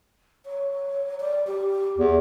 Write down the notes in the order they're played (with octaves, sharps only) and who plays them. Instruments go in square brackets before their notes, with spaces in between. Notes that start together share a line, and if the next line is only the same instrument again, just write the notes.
[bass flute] C#5
D5
G4
[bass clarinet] E2